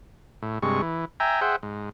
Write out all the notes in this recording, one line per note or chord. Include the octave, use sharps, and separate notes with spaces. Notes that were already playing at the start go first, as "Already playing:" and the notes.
A2
G2 C3 G#3 C#6
E3
E5 G5 G#5 A#5
G#4 C5 E5 F#5 G5
G#2